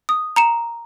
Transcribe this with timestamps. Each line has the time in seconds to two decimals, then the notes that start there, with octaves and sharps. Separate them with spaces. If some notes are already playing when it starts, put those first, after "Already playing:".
0.09 D#6
0.36 A#5 C#7 E7